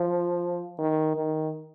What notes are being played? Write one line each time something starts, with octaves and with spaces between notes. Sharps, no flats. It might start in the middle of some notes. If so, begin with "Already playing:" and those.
Already playing: F3
D#3
D#3